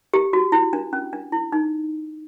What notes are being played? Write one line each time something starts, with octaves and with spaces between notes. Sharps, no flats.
G4
F#4
E4
D4
C#4
D4
E4
D#4